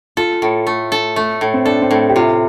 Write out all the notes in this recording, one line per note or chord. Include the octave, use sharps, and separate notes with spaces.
F4 A4
A2
A3
A4
A3
A2
C4
D4 A4
C4
A2
G4
C3 F4